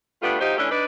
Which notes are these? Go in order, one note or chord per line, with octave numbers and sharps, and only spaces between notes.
G3 A3 B3 D4 F4
F#3 D#4 F4 G4 C5
E3 A3 C#4 D4 A4
D4 D#4 B4